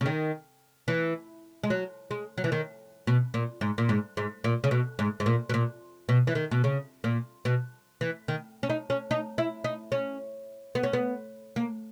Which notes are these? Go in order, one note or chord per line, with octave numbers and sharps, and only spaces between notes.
C#3
D#3
E3
G#3
F#3
G#3
F#3
E3
D#3
B2
A#2
G#2
A#2
G#2
G#2
A#2
C#3
B2
G#2
G#2
A#2
B2
A#2
B2
E3
D#3
B2
C#3
A#2
B2
E3
D#3
C#4
D#4
C#4
D#4
E4
D#4
C#4
B3
C#4
B3
A#3